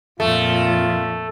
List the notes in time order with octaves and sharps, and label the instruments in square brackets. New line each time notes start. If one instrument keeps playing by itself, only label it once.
[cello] F2 A#2 [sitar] A3 [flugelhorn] F4